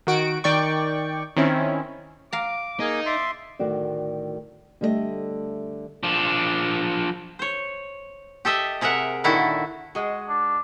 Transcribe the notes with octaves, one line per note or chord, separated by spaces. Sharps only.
D#3 F#4 D7
D#3 D5 G5 C#6
D#3 C4 C#4 E4
F5 A#5 D6
A#3 D#4 G#4
D5 E5 C6
D2 A2 D#3 F#4 D5
D3 G3 A3 G#4 D#5 E5
F3 D4
C5 C#5
G4 A4 D#5 E5
C3 G#4 A#4 E5 F#5
A#2 D3 D#3 E4 F#4 A4
G#3 F#4
D4